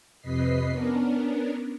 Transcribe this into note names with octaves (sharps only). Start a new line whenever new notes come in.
F2 C3 B4 D#5 B6 C7
B3 C#4 D4 A#4